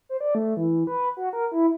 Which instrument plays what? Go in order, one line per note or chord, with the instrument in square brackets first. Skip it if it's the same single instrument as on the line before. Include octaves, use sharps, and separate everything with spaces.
[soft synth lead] C5
D5
A3
E3
B4
F#4
A#4
E4